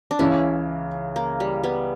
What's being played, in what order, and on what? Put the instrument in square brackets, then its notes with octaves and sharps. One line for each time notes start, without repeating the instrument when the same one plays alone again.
[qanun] D4
[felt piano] C#2 C#3 E3 [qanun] C#4 E4
[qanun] A#3
G3
G3 B3